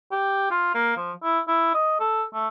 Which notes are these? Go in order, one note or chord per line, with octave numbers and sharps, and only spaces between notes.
G4
F4
A#3
F3
E4
E4
D#5
A4
A3